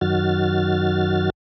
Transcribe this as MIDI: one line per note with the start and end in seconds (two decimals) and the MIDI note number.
0.01 1.30 42
0.01 1.30 51
0.01 1.30 54
0.01 1.30 66
0.01 1.30 89
0.01 1.30 93